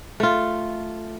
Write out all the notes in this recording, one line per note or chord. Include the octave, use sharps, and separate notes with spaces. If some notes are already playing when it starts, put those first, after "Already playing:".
A3 F4